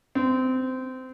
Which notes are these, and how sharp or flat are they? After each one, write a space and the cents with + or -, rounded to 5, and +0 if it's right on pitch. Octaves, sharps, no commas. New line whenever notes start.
C4 -20